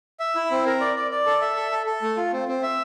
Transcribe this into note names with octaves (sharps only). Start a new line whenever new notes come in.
E5
E4
C4
A#4
D5
D5
D5
A4
E5
A4
A4
A4
A3
F4
C4
C4
E5